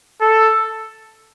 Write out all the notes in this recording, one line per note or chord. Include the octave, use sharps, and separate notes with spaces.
A4